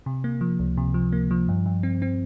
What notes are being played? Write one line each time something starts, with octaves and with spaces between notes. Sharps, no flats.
C3
A#3
F3
C#2
C3
F3
A#3
F3
G2
G2
C4
C4